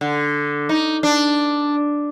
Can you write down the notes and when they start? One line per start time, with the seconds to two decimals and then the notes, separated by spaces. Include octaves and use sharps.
0.01 D3
0.69 D#4
1.03 D4